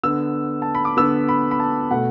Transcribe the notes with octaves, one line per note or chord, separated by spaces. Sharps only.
D3 B3 E6
A5
B5
D6
D3 B3 E6
B5
B5
A5
B2 A3 F#5